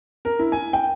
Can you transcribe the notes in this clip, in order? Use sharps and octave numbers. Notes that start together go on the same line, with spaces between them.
A#4
E4
G#5
G5